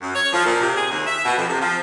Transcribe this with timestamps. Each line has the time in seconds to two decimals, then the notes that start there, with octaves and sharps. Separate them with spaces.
0.02 F#2
0.15 C#5
0.33 F3
0.46 A#2
0.61 C3
0.76 G#4
0.91 D#2
1.07 E5
1.24 B2
1.36 F2
1.48 C3
1.61 F3